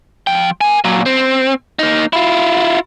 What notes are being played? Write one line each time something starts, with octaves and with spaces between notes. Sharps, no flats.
F3 G5
A#4 G#5
A#2 F#3
C4
A#3 D#4
E4 F4